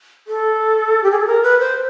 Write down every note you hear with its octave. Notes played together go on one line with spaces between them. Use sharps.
A4
G4
G#4
A4
A#4
B4
C5